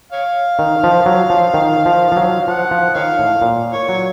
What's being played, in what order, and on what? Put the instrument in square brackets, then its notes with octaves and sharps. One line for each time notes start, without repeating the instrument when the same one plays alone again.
[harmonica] C#5 F5
[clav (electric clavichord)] D#3
F3
F#3
F3
D#3
F3
F3
F#3
[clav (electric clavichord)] F3 [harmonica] F#5
[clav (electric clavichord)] F3
[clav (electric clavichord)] D#3 [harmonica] C#5 F5
[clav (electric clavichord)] A2
A#2
[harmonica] C#5
[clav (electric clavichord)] F#3